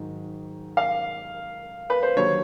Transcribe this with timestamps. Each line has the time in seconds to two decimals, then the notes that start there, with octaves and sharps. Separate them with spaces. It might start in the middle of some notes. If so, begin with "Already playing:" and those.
Already playing: G#2 D#3 F#3
0.77 F5
1.90 B4
2.03 C5
2.16 D#2 D3 F#3 C#5